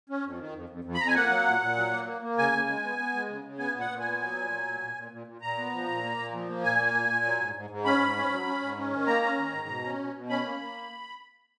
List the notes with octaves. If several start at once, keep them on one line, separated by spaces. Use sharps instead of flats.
C#4
F2
D#3
F2
F2
F2
B5
F2 A#5
G#5
A#3 F#5
F#3
A#2
A#2
F#3
A#3
A#3
A#3
C#3 G#5
C#3
G#3
B3
B3
G#3
C#3
C#3
B3 G#5
A#2
F#5
A#2
G#5
B3
F#3
A#2
F#3
A#2
A#2
A#2
A#2
A#2
A#2 A#5
B3
F3
A#2
A#3
A#2
F3
A#3
A#2 G#5
A#3
A#2
A#2
F#3
G#2
G#2
G#2
C#4 B5
G#2
C#4
F#3
C#4
G#2
C#4
D#3
A#3 A#5
C#4
D#3
G#2
B2
C#4
B2
B2
C#4 B5
A#3
A#3